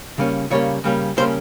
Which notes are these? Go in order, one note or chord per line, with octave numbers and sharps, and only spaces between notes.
C#3 G3 A#3 C#4
C#3 G3 A#3 C#4 C#5
C#3 G3 A#3 C#4
C#3 G3 A#3 C#4 C5